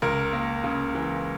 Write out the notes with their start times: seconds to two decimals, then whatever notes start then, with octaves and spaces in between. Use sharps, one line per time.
0.02 C#2 A#4
0.33 A#3
0.64 C#3
0.95 E3